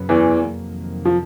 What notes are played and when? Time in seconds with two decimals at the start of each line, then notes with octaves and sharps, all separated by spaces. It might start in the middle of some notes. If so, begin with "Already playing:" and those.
Already playing: F#2 C#3 F#3 B3
0.09 E2 E3
0.41 F2 C3 D#3 F#3 A#3
1.05 F3